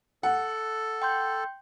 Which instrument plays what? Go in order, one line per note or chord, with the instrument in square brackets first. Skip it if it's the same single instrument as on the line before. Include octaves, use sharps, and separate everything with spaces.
[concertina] A4 [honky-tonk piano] F#5
[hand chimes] G5 C6 G6